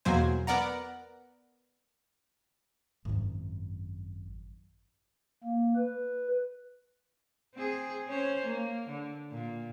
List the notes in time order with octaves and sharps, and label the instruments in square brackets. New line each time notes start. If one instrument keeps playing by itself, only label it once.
[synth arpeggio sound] E2 B2 F#3 A#3 C5 G#5
B3 A#4 D5 F#5 A#5
[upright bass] G#1 F#2
[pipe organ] A#3
B4
[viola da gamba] C4 G#4
C#4 C5 C#5
A#3
D3
A#2